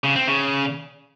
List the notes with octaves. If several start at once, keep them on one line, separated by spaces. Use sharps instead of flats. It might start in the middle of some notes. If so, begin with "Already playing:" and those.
C#3
C4
C#3